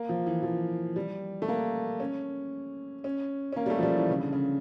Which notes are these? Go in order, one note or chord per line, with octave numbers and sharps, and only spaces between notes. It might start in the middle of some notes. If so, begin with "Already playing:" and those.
Already playing: A#3
F3
E3
F3
G3
A3
A#3
C#4
C#4
C#4
A#3
G3
A3
F3
G3
E3
C#3
D3
C#3